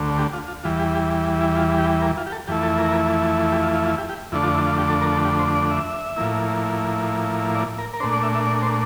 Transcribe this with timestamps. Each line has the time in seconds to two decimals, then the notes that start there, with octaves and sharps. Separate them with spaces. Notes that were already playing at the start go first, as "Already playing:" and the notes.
Already playing: D2 D3 A3
0.18 G4
0.33 F4
0.48 F4
0.64 E2 E3 G3 F4
0.79 G4
0.95 G4
1.41 E4
1.57 F4
1.78 G4
2.02 A#4
2.17 F4
2.26 G4
2.32 A4
2.48 F2 E3 A3 E4 G4
2.63 A4
2.78 A#4
3.52 G4
3.63 F4
3.74 F4
3.86 F4
3.98 G4
4.09 G4
4.32 F2 D3 A3 D4 E4
4.43 F4
4.55 E4
4.67 F4
4.78 G4
4.90 A4
5.01 A#4
5.12 A4
5.25 G4
5.39 C5
5.56 D5
5.71 E5
6.16 A2 F3 A#3 E4
7.54 D5
7.78 A#4
7.94 A#4
8.00 A#2 A3 D4 C5
8.13 D5
8.23 E5
8.35 E5
8.47 D5
8.62 C5